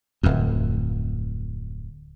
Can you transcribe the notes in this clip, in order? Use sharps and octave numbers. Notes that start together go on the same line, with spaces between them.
D1 F2